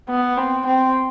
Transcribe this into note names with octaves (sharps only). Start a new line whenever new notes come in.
B3
C4
C4